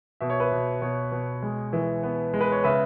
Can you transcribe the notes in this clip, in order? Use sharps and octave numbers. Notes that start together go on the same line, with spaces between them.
B2 E5
C#5
B4 E5
B2
B2 C#5
B2
G#3
E3
B3
G#3
B4
C#5
C#3 B4 E5